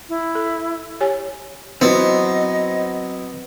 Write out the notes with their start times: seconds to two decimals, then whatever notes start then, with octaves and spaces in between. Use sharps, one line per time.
0.09 E4
0.35 A4
1.01 G4 C#5 G#5
1.81 F#3 B3 C4 E4 D#5